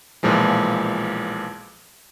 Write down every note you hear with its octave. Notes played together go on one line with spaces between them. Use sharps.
B1 A#2 E3 F3 G#3